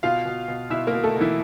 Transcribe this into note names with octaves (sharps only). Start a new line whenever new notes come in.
B2 F4 F5
B2
B2
B2 E4 E5
A#3 A#4
B2
A3 A4
B2
E3 E4